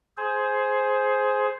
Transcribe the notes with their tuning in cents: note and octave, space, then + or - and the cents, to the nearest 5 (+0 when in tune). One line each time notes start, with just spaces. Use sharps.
G#4 +15 C5 +0